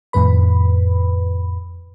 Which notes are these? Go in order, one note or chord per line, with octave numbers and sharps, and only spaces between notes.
F2 A2 D#3 B4 B5